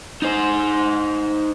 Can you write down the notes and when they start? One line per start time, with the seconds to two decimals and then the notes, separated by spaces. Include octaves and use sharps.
0.22 D#4 C5